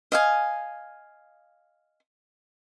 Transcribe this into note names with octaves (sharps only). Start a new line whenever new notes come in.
D#5 F5 G#5